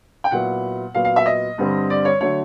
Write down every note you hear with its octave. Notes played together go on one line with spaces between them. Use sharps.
G5
A#2 F#3 B3 E4 F#5
A#2 F#3 B3 F5
F5
E5
D#5
G2 D3 G3 C4
D5
C#5
D3 F#3 A3 C#5